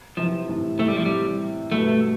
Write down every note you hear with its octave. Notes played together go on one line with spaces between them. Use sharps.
C3 E3 F3
A2 C3
A2 C3 A3
G3
F3
G3
G2 B2 A3